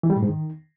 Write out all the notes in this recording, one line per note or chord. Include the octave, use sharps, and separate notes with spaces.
E3
G3
A2
G#2
D#3